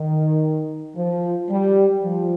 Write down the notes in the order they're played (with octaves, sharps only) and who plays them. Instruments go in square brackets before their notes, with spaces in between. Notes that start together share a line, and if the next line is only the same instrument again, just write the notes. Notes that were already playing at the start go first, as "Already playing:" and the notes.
Already playing: [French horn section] D#3
F3
G3
F3